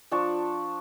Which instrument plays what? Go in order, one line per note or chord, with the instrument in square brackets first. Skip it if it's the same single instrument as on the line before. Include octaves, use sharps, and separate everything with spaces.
[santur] F3 D4 A5 C#6